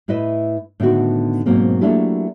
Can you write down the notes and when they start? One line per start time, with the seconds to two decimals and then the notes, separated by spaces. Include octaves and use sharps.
0.08 A2 E4 B4 D#5 E5
0.80 A2 D3 D#3 B3 F#4
1.46 G#2 B2 F#3 A#3 C4
1.81 F#3 A3 A#3 D4 E4 G4